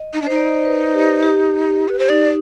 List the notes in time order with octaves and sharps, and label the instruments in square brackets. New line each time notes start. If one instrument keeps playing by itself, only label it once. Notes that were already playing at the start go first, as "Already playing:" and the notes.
Already playing: [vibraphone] D#5
[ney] D#4
D4
[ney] D#4 [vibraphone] C5
[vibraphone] D5
B4
G4
G4
[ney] B4
C5
[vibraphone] D#4 [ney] D5